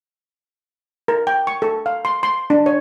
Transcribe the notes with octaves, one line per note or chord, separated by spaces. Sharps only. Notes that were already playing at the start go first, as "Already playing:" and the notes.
A#4
G5
C#6
A4
F5
C6
C6
D4
C#5